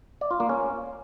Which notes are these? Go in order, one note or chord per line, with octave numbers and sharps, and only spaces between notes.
D5
F4
A#3
C#4